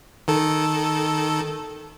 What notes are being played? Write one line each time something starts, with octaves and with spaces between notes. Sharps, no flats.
D#3 A4